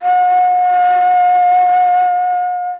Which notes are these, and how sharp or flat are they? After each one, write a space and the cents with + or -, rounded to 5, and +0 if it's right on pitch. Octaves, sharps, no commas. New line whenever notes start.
F#5 -45